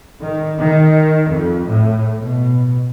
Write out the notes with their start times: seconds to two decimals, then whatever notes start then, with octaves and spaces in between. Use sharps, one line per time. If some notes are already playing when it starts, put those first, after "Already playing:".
0.21 D#3
0.58 D#3
1.31 F2
1.67 A2
2.20 B2